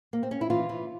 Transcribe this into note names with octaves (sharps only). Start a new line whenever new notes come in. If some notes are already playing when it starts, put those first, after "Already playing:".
A#3
C4
C#4
E4
E3 F4
E3